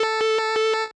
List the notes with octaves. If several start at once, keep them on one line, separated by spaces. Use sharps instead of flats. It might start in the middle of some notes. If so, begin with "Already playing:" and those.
Already playing: A4